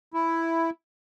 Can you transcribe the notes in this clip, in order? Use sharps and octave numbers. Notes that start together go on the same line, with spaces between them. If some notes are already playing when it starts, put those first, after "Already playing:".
E4